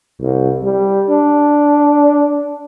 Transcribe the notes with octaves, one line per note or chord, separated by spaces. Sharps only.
C2
G3
D4